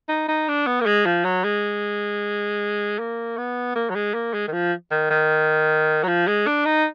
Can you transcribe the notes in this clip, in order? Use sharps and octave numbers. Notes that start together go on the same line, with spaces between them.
D#4
D#4
D4
B3
A#3
G#3
F3
F#3
G#3
A#3
B3
A#3
F#3
G#3
A#3
G#3
D#3
F3
D#3
D#3
F#3
F3
G#3
D4
D#4